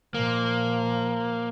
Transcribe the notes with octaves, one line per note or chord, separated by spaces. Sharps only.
A#2 F3 A#3